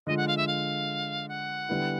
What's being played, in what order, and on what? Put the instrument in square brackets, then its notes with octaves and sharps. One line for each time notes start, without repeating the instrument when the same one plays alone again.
[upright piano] D3 F3 G#3 [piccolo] D#5
[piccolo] F#5
F5
E5
F5
F#5
[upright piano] D3 G3 B3 E4